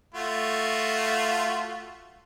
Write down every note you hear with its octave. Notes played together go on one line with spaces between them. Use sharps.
A3 F4 F#4